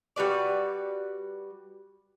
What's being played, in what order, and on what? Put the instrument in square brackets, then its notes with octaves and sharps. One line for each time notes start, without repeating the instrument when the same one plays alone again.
[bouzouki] G3 F#4 B4 D5